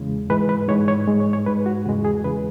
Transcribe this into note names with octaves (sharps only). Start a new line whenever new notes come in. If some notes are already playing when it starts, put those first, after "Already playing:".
Already playing: E2 C#3 G#3
G#2 E3 G#3 B4
B4
G#2 E3 G#3 C#5
C#5
G#2 G#3
C#5
C#5
G#2 G#3 B4
F#4
E2 C#3 E3 G#3 F#4
G#4
E2 C#3 E3 G#3 B4